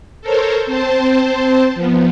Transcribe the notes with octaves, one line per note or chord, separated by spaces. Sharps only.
A4 A#4 C5 C#5
C4 C5 A5
F3 B3